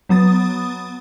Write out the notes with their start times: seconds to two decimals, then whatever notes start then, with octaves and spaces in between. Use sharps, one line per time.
0.09 F#3 B3 D#6 A6